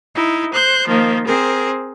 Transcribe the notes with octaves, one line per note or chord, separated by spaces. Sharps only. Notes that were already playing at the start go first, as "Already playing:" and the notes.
D#4 E4
C5 F#6 G6
D#3 F3 A#3
C4 G#4 A#4 C5